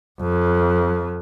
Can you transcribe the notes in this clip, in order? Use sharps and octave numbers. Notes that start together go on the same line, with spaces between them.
F2